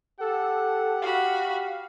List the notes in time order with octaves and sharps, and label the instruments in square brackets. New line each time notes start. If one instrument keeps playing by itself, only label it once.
[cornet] G4 [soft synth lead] A4 [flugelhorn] F#5
[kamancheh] F#4 B5 [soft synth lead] F5